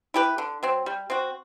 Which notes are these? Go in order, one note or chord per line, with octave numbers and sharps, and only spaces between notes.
E4 G4 B4
D3
F#3 C4
G3
C4 F#4